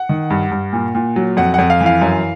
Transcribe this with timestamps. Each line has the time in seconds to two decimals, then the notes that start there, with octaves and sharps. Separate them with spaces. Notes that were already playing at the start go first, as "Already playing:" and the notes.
Already playing: F#5
0.09 D#3
0.30 G2
0.51 G2
0.73 A#2
0.95 A#2
1.16 F#3
1.37 F2 F#5
1.54 F2 F#5
1.70 F5
1.81 E3
1.86 F5
2.01 F#2